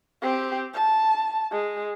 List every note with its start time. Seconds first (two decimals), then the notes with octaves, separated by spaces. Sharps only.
0.22 C4 G4
0.74 A5
1.51 G#3